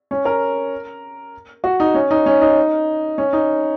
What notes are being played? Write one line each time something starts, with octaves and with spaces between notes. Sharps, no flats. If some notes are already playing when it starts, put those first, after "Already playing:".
C#4
A#4
F#4
D#4
C#4
D#4
C#4
D#4
C#4
D#4